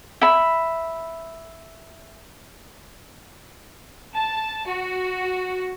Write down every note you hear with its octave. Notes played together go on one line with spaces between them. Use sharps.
E5 B5
A5
F#4